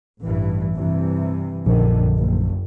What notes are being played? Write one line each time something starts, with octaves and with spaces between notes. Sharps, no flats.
A1 G2 E3
G2 C3 E3
A#1 F#2 D3 D#3
F#1